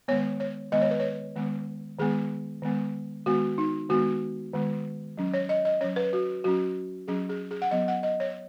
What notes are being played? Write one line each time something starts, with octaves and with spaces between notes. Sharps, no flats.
D#3 G#3 B3 C#5
C#5
D#3 G#3 B3 D#5
C#5
B4
C#5
D#3 G#3 B3
D#3 G#3 B3 G#4
D#3 G#3 B3
D#3 G#3 B3 F#4
D#4
D#3 G#3 B3 F#4
D#3 G#3 B3
F#3 C#4
C#5
D#5
D#5
F#3 C#4 C#5
B4
F#4
F#3 C#4 F#4
F#3 C#4 G#4
G#4
G#4
F#5
F#3 B3 D#5
F#5
D#5
C#5